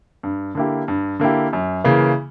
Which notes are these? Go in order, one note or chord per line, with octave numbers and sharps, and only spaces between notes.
G2
D3 A#3 E4 G4
G2
D3 A#3 E4 G4
F#2
C#3 E3 A#3